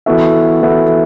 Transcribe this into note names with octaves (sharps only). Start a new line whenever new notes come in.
E3 B3 F#4 A4 E5
E3 B3 F#4 A4 E5